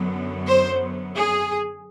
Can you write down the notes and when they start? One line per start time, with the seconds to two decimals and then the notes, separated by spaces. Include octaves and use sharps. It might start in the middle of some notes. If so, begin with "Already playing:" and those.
Already playing: F#2 D3 F#3 B3
0.47 C5
1.13 G#4